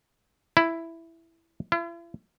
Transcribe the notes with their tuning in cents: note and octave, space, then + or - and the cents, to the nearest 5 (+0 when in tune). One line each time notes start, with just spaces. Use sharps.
E4 +5
E4 +45